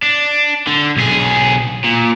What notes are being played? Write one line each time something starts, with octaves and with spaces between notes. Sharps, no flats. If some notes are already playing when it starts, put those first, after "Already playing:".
D4
D3
B1 G#4
A#2